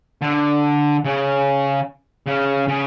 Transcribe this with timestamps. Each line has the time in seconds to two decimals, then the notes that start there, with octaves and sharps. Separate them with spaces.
0.22 D3
1.05 C#3
2.26 C#3
2.68 C#3